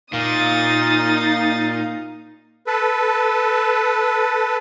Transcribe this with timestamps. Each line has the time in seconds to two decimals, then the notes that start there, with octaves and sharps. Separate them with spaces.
0.13 A#2 D#4 F5 D#6 A6
2.67 A4 B4